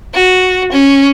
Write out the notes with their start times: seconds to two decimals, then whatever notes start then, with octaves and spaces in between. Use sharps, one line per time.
0.14 F#4
0.72 C#4